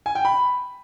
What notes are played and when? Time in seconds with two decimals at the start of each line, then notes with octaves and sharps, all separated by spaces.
0.06 G#5
0.15 G5
0.25 B5